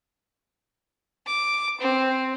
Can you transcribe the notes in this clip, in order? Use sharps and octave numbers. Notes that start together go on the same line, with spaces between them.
D6
C4